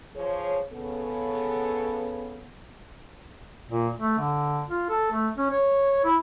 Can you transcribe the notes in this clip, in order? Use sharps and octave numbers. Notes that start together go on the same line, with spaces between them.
F3 G#4 C#5
C#3 B3 A4
A#2
A3
D3
F4
A4
A3
C#4
C#5
E4